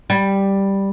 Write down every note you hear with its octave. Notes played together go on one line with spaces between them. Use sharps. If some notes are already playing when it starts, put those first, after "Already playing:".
G3